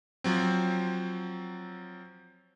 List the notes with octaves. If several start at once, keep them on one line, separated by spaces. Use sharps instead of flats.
F3 F#3 C4